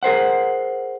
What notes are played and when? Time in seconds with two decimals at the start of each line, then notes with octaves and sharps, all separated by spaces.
0.03 G#4 A#4 C5 F#5